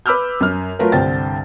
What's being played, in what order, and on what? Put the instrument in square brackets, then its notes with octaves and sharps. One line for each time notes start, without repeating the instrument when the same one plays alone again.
[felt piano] B4 B5 D6 E6 F6 G6
F#2 F6
F#3 A3 F4 A#4 B4
C2 G2 D3 C5 G5 A6